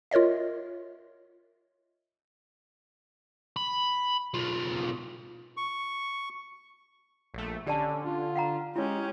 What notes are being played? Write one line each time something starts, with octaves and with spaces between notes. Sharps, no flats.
F4 A#4 C#5 D#5 E5
B5
B1 F4
C#6
A#1 A3
D3 C#4 G4 D5 A5
F4
F5 F#5 A#5
G#3 C#4 E4 G4 C#5